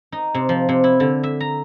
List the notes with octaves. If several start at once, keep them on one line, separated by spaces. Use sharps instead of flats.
D#4
C3
F3
C3
E4
D3
E5
A#5